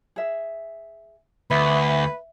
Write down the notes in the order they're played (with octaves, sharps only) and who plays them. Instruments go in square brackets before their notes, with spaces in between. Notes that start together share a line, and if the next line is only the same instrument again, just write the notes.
[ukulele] G#4 E5
[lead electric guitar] D2 [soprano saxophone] B4 [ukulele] E5